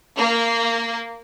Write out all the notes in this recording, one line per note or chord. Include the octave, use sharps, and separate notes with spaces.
A#3